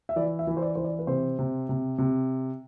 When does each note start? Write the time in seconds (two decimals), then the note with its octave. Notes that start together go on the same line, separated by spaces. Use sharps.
0.09 E5
0.16 E3 D5
0.39 E5
0.47 E3
0.57 C5
0.62 D5
0.75 E3 C5
0.84 D5
0.99 B4
1.07 C3 C5
1.39 C3
1.69 C3
1.98 C3